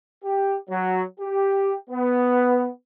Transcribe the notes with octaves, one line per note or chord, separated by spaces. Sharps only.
G4
F#3
G4
B3